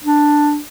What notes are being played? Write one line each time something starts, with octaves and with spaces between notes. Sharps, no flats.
D4